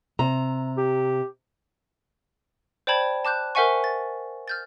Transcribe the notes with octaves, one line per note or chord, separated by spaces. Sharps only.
C3 A#5
G4
C5 D5 G5 A5 B5 G#6
A5 D6 F#6 G6
A#4 C5 E5 F#5 G#5 C#6
A6
F6 G6 A6